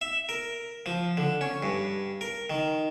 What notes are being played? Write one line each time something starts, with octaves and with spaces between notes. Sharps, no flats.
E5
A#4
F3
D3
C#4
G2
A#4
D#3